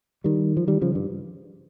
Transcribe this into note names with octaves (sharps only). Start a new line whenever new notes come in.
D#3 G3
F3
D#3 G3
C#3 F3
G2